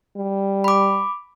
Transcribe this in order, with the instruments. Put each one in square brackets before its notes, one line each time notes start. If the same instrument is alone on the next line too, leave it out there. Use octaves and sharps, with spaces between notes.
[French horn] G3
[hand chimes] B5 D6